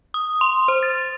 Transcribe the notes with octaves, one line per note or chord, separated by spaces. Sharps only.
D#6
C6
C5
A6